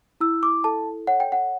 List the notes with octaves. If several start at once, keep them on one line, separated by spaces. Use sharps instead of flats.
E4 E6
D6
A4 A5
C#5 F#5
G5
F#5